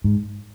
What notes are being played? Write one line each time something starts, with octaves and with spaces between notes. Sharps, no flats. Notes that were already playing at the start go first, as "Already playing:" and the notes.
G#2